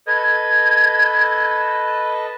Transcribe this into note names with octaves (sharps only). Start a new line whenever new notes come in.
A4 B4 D#5 G#6